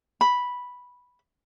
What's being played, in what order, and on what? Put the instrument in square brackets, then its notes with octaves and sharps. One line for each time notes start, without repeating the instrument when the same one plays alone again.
[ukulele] B5